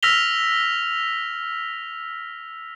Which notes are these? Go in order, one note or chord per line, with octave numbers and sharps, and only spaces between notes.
E6 F6 A#6 B6 F7 G7